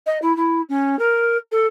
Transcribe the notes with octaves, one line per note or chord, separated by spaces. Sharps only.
D#5
E4
E4
C#4
A#4
A4